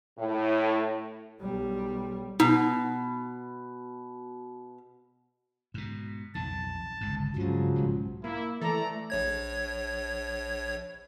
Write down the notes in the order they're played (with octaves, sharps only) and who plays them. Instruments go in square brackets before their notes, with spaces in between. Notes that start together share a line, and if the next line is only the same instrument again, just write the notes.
[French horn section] A2
[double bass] B1 G3
[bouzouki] B2 [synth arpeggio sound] D#4
[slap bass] G#2 B2
[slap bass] B1 F2 D#3 [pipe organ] A5
[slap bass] G1 C#2 G#2
[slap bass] G2 G#3 [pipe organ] C#3 F3 F#3
[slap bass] B1 G#2
[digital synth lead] A#3 [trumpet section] E4
[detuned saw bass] E3 [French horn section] A3 [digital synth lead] A4 [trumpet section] D5 A#5
[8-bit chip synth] A#1 C#5 G#6